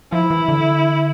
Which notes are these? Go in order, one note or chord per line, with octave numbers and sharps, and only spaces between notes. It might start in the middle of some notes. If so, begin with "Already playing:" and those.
F3 E4
E3
D3